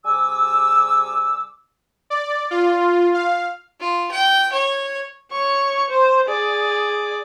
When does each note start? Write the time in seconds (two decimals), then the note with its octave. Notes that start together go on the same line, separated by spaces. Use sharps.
0.05 C3 G3 G#4 G#5 D6 E6
2.10 D5
2.51 F4
3.14 F5
3.80 F4
4.11 G5
4.52 C#5
5.31 C#5 C#6
5.90 C5
6.28 G#4 D5